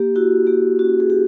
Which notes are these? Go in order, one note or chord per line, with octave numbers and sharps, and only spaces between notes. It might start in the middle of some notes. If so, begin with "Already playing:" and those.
Already playing: A#3 G4
E4 F#4
A#3 G4
C#4 F#4
G#4
A#3 G4